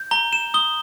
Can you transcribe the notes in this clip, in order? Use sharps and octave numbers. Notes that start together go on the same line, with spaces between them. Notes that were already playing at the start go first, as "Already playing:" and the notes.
Already playing: G6
A#5 G7
E7
D#6 G7